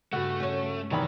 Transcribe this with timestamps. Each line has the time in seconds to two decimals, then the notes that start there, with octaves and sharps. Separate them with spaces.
0.12 G2 C#3 A3 F#4
0.40 C#4 C#5
0.65 D7
0.91 E2 C3 D#3 F#3 B5